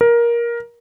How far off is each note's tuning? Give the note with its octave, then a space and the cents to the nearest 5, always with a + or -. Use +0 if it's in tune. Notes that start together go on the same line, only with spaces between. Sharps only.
A#4 +15